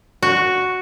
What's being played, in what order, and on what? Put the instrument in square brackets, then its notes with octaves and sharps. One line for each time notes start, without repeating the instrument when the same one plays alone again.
[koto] F#4